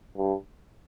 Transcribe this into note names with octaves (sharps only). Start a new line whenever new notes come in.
G2